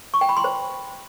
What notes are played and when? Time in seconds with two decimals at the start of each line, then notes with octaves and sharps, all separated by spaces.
0.14 C#6
0.21 G5
0.29 B5
0.37 C6
0.44 C5